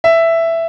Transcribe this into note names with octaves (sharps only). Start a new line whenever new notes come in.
E5